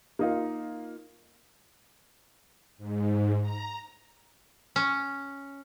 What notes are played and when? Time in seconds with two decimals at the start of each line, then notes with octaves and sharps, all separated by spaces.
0.19 A#3 D#4 F4
2.78 G#2
3.41 A#5
4.76 C#4